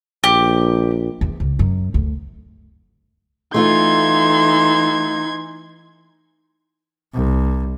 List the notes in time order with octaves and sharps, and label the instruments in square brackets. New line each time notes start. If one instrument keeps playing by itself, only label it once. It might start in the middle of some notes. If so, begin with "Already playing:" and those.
[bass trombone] A#1 [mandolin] G4
[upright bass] E2
C#2
F#2
D2
[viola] E3 C6 [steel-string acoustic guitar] A3 F4 [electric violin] D#4 G#6
[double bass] C2